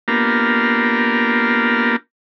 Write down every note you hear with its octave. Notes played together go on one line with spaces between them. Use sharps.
A#3 B3 D4 F4 G4 A#4